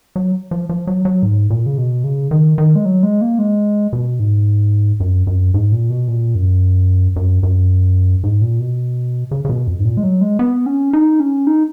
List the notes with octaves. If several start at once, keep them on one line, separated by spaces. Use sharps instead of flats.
F#3
F3
F3
F#3
F#3
G#2
A#2
C#3
B2
C#3
D#3
D#3
G#3
F#3
G#3
A#3
G#3
B2
G#2
F#2
F#2
G#2
A#2
B2
A#2
F#2
F#2
F#2
G#2
A#2
B2
C#3
C#3
B2
F2
G#2
A#2
G#3
F#3
G#3
B3
C#4
D#4
C#4
D#4